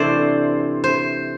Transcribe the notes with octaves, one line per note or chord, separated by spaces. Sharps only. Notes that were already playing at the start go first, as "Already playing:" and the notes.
Already playing: C3 E3 A3 D4 C5 D5
C5